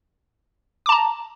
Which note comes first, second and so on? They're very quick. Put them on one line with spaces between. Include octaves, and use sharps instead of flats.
D6 A5 A#5